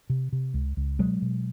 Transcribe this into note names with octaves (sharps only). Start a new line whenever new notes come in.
C3
C3
C#2
C#2
B2 F#3 G#3
B2